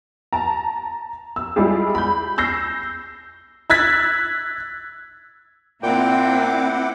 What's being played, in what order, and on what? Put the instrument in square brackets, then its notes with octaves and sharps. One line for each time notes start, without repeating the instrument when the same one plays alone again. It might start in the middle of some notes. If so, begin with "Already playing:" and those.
[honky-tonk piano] A5 A#5
E6
G3 G#3 E4 F4 G4 G#4
B5 G6
E6 G6 A#6 C7
E6 F#6 G#6 A6 B6
[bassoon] A#2 [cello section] A#3 C4 [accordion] E4 F#5 D6 [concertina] G5